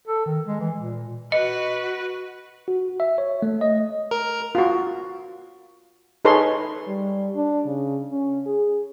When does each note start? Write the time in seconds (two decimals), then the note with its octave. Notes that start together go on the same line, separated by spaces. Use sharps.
0.07 A4
0.26 D#3
0.47 G#3
0.60 E3
0.76 A#2
1.32 F#4 B4 D#5
2.68 F#4
3.00 E5
3.18 C#5
3.42 A3
3.61 D#5
4.11 A#4
4.55 F4 F#4
6.25 D#4 G#4 A4 B4 C#5 C6
6.88 G3
7.36 D4
7.66 C#3
8.12 C#4
8.46 G#4